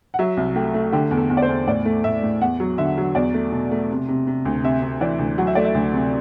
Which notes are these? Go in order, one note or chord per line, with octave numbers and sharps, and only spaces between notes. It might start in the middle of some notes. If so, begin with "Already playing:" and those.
F#5
F#3 E5
C2
A3 G4
A3
D3 G4
E2
A4
E2
D5
C5
E2
A2 D5
A3
A2 E5
A2
E2 F#5
F#3
D3 E5
F#3
E2 D5
A3
B2
A3
C3
C3
C3
D2
C3 E5
C3
E3 D5
D2
F#3 F#5
E5
A3 D5
E5
D2
C3